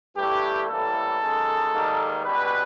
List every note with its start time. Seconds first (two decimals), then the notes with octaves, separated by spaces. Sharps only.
0.15 G2 E3 A3 G4
0.67 A2 E3 G3 A#3 A4
1.20 F#2 D#3 G#3
1.72 G#2 D#3 G3 A#3
2.24 C#2 B2 G3 B4